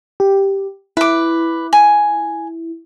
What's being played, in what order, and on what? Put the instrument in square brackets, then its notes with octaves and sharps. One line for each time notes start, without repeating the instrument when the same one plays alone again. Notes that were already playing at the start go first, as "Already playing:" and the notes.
[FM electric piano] G4
[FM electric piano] E4 [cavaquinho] B4 D6
[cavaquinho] G#5